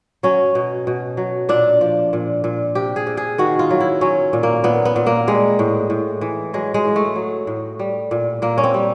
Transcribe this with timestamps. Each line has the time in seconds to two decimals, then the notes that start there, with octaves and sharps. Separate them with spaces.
0.23 F#3 C#4
0.55 B2
0.87 B2
1.17 F#3
1.49 A#2 D4
1.81 F3
2.13 A#2
2.44 A#2
2.75 C3 G4
2.96 G#4
3.07 C3
3.17 G#4
3.38 D#3 F#4
3.59 F4
3.70 F#3
3.81 E4
4.01 F#3 C#4
4.33 A#2
4.43 A#3
4.64 A#2 B3
4.85 B3
4.96 A#2
5.06 A#3
5.27 G3 G#3
5.59 A2
5.90 A2
6.21 E3
6.54 F#3 G#3
6.74 G#3
6.85 A2
6.96 A3
7.16 F#3
7.47 A2
7.79 G3
8.11 A#2
8.42 A#2 A#3
8.58 C#4
8.64 C4
8.74 G3